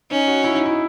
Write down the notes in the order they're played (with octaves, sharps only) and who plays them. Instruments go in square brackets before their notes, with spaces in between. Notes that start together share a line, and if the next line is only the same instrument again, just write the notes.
[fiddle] C#4 [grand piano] D#4
[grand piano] F#4
E4
D#4
E4